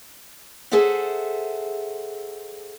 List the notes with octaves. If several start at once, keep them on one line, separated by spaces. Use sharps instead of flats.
G#4 A4 C5 E5 F#5